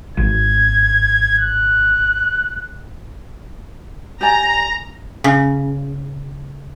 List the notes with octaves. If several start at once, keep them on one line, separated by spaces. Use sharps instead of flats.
G#1 G#6
F#6
G4 D5 G#5 A#5
C#3